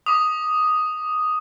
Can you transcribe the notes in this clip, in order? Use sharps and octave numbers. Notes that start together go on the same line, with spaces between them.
D6 D#6